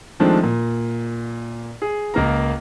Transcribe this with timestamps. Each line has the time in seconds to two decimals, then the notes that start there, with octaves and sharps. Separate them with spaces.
0.20 D#3 F3 G#3 A3 C4 D4
0.44 A#2
1.82 G#4
2.14 C#2 A#3 A#4 A#5